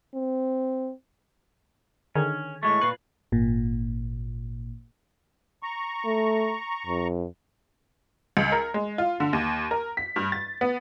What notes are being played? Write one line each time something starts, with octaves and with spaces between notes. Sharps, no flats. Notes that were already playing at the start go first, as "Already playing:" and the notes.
C4
D3 D#3 C#4 G#4
A2 G#3 A3 C#6
A#2 B4 C7
G#1 A#2
A#5 C#6
A3
F2
C#2
A#4
G#3
F4
D3
D#2
A#4
B6
G2
A6
B3